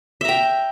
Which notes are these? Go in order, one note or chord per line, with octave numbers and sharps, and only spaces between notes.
E5 G5 A#5